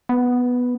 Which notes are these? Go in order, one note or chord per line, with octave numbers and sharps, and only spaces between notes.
B3